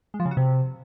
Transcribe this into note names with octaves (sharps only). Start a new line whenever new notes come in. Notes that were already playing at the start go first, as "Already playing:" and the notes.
G#3
F3
C#3
F#4
C3